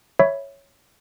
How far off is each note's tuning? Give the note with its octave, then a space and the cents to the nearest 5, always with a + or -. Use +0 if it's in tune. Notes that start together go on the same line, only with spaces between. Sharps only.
C#5 +0 E5 +0 B5 +0